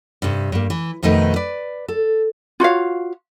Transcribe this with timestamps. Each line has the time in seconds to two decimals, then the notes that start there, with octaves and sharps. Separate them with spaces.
0.22 G2 C3
0.52 G2 A#3
0.70 E3
1.03 F2 B2 D#3 A3 D#4 B4
1.36 B4 D5
1.88 A4
2.60 F4 F#4 C#5 F5